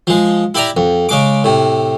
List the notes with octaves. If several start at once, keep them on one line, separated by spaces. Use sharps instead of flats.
F3 G#3
E4 G4 D5 E5 A#5
F2
C#3 G#3 D6
A2 C3